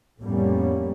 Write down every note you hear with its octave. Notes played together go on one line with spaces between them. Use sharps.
F2 A2 G3 A#3 B3 C#4